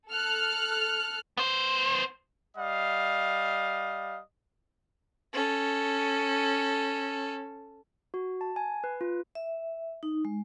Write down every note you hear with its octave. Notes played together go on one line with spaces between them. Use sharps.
A4 F6 F#6
B3 C5
G3 D#5 F5
C#4 A4
F#4
A5
G#5
B4
F4
E5
D#4
G#3